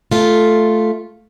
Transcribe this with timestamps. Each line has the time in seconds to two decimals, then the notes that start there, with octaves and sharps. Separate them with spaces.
0.11 A3 F4